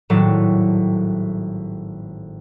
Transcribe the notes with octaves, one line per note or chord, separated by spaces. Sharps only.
G#1 A2 F#3 G3 A4 E7